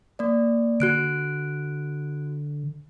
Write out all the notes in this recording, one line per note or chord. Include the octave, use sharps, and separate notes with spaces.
A#3 D5
D3 F#4 F#6 D7